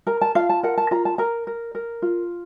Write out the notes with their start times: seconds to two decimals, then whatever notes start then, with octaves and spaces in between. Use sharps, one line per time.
0.07 A#4 A#5
0.21 A5
0.35 F4 F5
0.49 A5
0.63 A#4 F#5
0.77 A5
0.91 F4 A#5
1.05 A5
1.18 A#4 A#5
1.47 A#4
1.75 A#4
2.02 F4